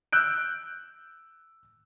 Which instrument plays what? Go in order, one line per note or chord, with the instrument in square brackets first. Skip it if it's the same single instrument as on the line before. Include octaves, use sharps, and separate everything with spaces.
[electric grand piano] E6 F#6 G6 D7